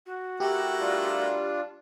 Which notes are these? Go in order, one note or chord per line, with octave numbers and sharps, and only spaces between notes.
F#4
A3 E4 G4 A#4
G3 D4 F4